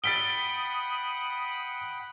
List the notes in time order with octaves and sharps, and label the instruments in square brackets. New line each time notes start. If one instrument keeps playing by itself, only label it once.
[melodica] F#5 G5 B5 [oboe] D#6 [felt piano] A6 B6 D7 [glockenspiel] G7